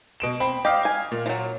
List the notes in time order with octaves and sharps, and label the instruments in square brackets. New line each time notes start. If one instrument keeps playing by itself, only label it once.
[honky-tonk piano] B2 D7 E7
[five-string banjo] C4 [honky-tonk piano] B5
[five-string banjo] G4 [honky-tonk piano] D#5 F5
[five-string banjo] G#5
[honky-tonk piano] A#2
[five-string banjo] F3 F#3